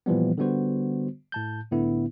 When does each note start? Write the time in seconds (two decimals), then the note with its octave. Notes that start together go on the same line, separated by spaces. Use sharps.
0.06 A#2 E3 F3 G3 B3
0.38 D3 G3 B3 F#4 C5
1.32 A2 A5 G6
1.71 C2 A2 D3 B3 E4